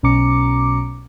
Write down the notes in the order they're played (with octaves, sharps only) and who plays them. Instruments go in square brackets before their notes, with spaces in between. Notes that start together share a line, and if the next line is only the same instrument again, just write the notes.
[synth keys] B1 B2 C#4 A#5 D6 C#7